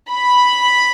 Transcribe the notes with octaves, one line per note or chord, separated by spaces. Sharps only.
B5